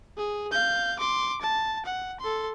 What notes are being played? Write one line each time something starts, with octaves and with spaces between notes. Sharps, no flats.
G#4
F5 G6
C6 D6
A5
F#5
A4 C6